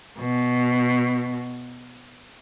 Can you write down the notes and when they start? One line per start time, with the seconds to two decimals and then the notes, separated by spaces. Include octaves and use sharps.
0.20 B2